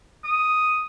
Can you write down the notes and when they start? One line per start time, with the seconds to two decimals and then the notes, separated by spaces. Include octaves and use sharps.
0.24 D#6